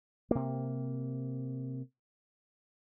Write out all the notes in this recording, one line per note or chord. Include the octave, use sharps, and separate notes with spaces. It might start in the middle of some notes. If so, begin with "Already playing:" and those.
C3 A#3